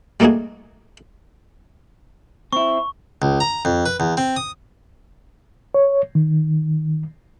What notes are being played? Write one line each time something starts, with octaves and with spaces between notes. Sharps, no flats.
G3 A3 A#3 D#4 F#4 G#4
C4 E4 C#6
C#2
A#5
F2
B4
E2
C4
D#6
C#5
D#3